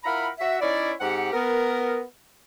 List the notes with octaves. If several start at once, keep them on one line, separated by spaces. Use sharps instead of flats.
E4 F4 A#4 F#5 A#5 B5
F#4 E5
C#4 D#4 E4 C#5 D5
G#2 C4 G4 F#5
B3 A#4